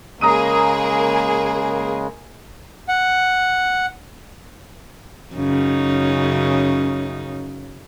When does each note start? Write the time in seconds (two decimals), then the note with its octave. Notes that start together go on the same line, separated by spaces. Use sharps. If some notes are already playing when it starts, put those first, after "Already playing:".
0.21 C#3 G#3 A#3 G#4 A#5 D#6 D#7
2.88 F#5
5.35 F#2 C#3 D#4